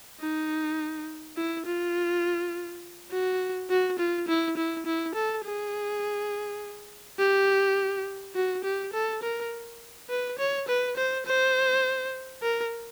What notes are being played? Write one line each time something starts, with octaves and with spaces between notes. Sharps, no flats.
D#4
E4
F4
F#4
F#4
F4
E4
E4
E4
A4
G#4
G4
F#4
G4
A4
A#4
B4
C#5
B4
C5
C5
A#4